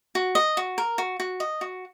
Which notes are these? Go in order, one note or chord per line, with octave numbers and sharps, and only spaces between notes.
F#4
D#5
F#4
A#4
F#4
F#4
D#5
F#4